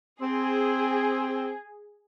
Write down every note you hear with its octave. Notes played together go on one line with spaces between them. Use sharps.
C4 G#4